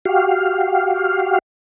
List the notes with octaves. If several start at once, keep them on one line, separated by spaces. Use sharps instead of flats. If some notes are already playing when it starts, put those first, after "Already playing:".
F#4 G4 F5